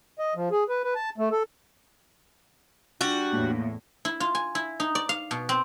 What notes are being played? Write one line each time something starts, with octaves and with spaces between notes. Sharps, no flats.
D#5
F3
G#4
B4
B4
A5
A3
A4
G3 D4 F4 F#4
E2 A2 A#3
E4
F4
G#5
E4
D#4
D5
F5
B2
C4